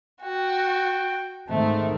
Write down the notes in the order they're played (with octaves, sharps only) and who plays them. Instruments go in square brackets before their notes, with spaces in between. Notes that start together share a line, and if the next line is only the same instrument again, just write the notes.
[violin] F#4 [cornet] G5
[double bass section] G#2 D#3 C4 [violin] A3